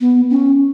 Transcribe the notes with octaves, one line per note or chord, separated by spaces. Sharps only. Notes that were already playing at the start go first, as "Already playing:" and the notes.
B3
C#4